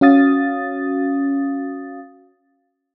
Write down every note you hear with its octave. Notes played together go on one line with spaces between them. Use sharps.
C#4 F#4 F5 D#6 A6